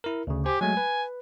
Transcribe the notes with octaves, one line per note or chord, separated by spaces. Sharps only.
E4 A#4
D2 C#3
G4 C5 G#5
F#3 G#3 A3 G#5
B4